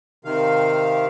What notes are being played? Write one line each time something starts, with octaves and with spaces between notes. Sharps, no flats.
C3 D#3 F5